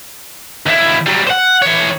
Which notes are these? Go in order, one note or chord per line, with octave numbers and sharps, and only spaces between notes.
D#2 E4
F#3 G3
C5 F#5
E3 C#5